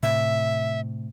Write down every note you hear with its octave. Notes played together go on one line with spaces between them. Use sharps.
A2 C3 E5